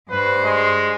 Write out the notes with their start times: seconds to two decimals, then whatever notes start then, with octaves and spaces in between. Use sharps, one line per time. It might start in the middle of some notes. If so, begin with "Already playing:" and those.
0.11 G2 B4 C5
0.44 G#3